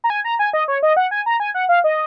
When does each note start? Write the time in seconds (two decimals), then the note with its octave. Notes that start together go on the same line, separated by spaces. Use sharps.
0.04 A#5
0.10 G#5
0.25 A#5
0.39 G#5
0.53 D#5
0.68 C#5
0.83 D#5
0.97 F#5
1.11 G#5
1.26 A#5
1.40 G#5
1.54 F#5
1.69 F5
1.84 D#5